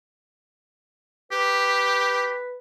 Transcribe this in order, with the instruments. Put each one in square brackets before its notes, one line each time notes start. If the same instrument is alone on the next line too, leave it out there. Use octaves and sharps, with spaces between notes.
[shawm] G4 [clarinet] B4